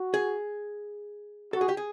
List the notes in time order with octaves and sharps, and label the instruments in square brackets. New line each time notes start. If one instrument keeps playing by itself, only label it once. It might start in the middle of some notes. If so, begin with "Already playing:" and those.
Already playing: [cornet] F#4
[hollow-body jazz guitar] G#4
[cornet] F#4 [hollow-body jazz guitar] A4
[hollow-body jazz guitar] G#4
G4
G#4